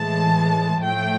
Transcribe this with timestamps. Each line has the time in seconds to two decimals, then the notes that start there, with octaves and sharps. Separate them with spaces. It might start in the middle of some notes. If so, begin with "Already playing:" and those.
Already playing: A2 E3 G#3 A5
0.81 A2 F3 A3 G5